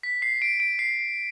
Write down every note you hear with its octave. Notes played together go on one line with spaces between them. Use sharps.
B6
C7
D7
D7
C7